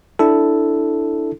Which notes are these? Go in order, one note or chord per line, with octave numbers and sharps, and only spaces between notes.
D4 E4 A4